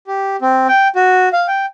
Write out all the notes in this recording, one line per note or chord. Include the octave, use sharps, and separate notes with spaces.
G4
C4
G5
F#4
F5
G5